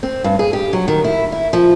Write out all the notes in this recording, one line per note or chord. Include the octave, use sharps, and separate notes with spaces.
C4
G2
G#4
G4
F#3
D#3
E4
E4
F3